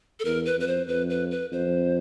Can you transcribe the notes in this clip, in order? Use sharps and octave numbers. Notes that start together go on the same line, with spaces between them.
A4
E2 A#4
B4
F2 B4
C5
F2 B4
B4
B4
F2 C5